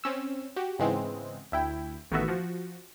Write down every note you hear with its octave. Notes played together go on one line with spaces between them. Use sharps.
C4 C#4 E6
F#4 G4
G#2 C#3 E3 G#3 B3 C4
D2 E4 G5
A1 D#3 A3 B3 F#4 E5
F3 F#4